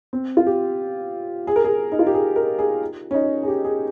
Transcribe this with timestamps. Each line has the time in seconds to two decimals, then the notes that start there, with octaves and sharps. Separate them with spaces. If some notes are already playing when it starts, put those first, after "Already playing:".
0.13 C4
0.37 F4
0.46 G4
1.47 G#4
1.56 A#4
1.64 G#4
1.92 D#4
1.99 F4
2.07 G4
2.14 G#4
2.36 A#4
2.59 G#4
3.11 C#4
3.14 D#4
3.43 G#4
3.48 G4
3.65 G#4